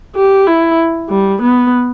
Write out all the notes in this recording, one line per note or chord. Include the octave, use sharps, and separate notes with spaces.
G4
E4
G3
B3